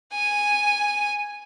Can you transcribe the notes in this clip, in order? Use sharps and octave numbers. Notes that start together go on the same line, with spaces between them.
G#5